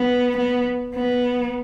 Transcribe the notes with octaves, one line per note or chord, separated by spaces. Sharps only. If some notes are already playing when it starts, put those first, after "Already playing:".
Already playing: B3
B3
B3